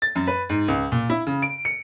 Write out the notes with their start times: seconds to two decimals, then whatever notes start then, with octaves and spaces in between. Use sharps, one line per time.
0.02 A6
0.15 F#2
0.27 B4
0.49 G#2
0.68 C#2
0.92 A#2
1.10 E4
1.27 C#3
1.42 D7
1.65 C#7